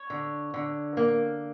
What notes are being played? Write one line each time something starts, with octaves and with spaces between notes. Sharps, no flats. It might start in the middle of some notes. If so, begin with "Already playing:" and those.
Already playing: C#5
D3
D3
A#3